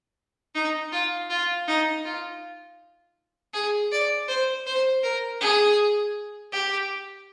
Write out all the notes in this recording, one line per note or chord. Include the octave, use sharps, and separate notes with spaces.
D#4
F4
F4
D#4
F4
G#4
D5
C5
C5
A#4
G#4
G4